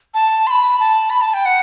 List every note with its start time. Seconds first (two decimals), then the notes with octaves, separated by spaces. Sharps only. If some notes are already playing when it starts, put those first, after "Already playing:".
0.14 A5
0.47 C6
0.50 B5
0.80 A5
1.10 B5
1.21 A5
1.34 G5
1.45 F#5